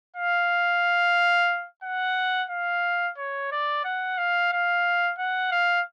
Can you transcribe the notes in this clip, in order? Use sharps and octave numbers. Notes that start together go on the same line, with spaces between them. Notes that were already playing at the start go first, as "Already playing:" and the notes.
F5
F#5
F5
C#5
D5
F#5
F5
F5
F#5
F5